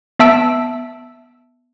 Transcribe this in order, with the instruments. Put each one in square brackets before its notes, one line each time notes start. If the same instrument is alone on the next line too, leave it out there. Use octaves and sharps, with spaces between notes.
[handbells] B3 E5 A5 E6 D7